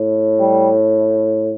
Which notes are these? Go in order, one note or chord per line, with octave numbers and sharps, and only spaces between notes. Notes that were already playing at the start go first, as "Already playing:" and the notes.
Already playing: A2
G3